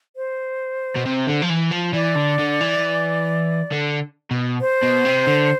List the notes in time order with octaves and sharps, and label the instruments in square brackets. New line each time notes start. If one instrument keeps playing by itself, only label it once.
[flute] C5
[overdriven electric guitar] B2
C3
D3
F3
E3
F3
[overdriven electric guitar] E3 [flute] D5
[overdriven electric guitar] D3
D3
E3
D3
B2
[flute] C5
[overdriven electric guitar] B2
C3
D3